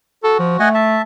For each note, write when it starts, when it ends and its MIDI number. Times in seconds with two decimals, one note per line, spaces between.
0.23 0.59 66
0.23 0.34 69
0.39 0.59 53
0.59 1.00 57
0.59 0.69 75
0.59 0.69 78
0.59 0.69 80
0.74 1.02 76
0.74 1.02 81